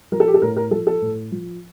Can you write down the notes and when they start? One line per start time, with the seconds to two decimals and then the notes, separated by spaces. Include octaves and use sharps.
0.12 F3 A#4
0.20 A4
0.27 G4
0.34 A4
0.42 A2 A#4
0.57 A#4
0.71 F3 A4
0.87 A4
1.01 A2
1.32 F3